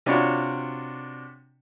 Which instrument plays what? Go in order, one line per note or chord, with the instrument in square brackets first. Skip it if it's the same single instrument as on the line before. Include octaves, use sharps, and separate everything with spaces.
[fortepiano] C3 D4 F4 F#4 C#5